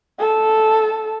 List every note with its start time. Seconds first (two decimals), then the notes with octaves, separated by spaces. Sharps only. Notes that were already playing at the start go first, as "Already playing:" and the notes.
0.19 A4